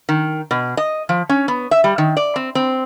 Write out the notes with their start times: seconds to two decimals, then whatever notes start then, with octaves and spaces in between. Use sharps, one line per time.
0.09 D#3
0.51 B2
0.77 D#5
1.09 F3
1.29 C#4
1.48 B3
1.71 E5
1.84 G3
1.98 D#3
2.17 D5
2.36 C4
2.55 C4